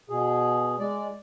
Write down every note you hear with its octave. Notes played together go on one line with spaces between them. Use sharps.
B2 G#4
G#3 D5